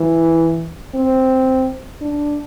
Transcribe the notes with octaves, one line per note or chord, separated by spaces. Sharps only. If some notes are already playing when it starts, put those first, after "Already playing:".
Already playing: E3
C4
D4